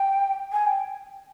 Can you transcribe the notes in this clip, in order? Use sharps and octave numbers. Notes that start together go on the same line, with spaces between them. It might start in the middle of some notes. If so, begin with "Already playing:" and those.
Already playing: G5
G#5
G5